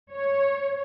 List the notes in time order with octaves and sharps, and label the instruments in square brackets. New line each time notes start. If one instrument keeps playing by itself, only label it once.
[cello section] C#5